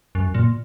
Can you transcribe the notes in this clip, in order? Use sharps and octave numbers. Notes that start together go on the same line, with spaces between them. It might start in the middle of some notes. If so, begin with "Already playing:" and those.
F#2
A#2